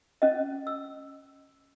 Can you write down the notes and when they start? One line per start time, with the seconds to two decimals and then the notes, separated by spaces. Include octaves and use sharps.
0.22 C#4 D#5
0.67 E6